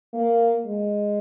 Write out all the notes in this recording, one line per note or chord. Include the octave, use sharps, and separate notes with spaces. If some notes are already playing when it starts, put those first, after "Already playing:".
A#3
G#3